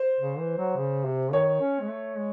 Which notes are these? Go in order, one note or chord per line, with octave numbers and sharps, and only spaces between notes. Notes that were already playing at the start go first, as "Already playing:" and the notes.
Already playing: C5
C#3
E3
F#3
C#3
C3
D#3 C#5
C#4
G#3
A3
G#3